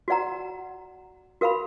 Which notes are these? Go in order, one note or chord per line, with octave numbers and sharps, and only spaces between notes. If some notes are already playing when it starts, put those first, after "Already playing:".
F#4 D5 F#5 A#5
F#4 A#4 F5 B5